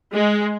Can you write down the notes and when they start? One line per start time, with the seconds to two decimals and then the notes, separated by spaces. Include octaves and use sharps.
0.13 G#3